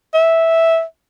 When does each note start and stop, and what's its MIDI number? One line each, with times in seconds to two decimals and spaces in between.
0.14 0.82 76